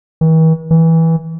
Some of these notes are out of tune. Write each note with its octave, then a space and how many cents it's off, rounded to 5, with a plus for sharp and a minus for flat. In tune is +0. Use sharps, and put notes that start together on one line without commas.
E3 -45
E3 -15